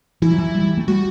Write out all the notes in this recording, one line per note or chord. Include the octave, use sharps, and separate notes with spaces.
E3 E4
F#3
E3
G3
A3
G3 F#4